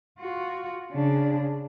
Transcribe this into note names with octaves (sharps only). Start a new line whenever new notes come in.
F4 F#4
C#3 D4